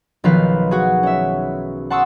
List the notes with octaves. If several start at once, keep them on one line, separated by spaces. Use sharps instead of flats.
B1 D#3 F3 B4 F5
F#4 G#4
C#4 E5
F#5 A5 C6 C#6 D#6 E6